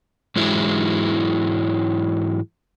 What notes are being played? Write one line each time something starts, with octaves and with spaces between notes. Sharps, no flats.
G#2 E3 F#3 G#3 E4